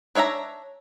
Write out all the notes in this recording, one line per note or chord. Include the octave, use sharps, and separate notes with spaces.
D4 C#5 E5 F5 A#5